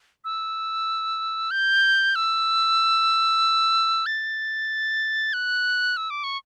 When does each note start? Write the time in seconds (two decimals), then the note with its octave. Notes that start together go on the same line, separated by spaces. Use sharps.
0.25 E6
1.51 G6
2.15 E6
4.06 A6
5.33 F#6
5.97 E6
6.10 D6
6.24 C#6